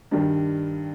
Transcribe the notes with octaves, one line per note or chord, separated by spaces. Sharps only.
G2 D#3 G3